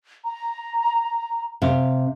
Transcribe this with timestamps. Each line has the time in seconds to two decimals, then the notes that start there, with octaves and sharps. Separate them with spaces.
0.25 A#5
1.62 C3 F5